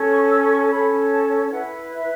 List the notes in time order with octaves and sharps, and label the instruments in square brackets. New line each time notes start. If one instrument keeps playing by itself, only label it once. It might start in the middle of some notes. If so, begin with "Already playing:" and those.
Already playing: [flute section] C#4 A4 C#5
C#6
E6
C#6
A5
C#4 A4 C#5 B5
A5
E4 B4 F#5
E5